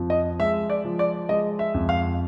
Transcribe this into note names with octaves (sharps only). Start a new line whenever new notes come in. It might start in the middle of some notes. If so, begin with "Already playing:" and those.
Already playing: F2 F3
D#5
G#3 E5
D5
F3
D5
G#3 D#5
E5
F2
F5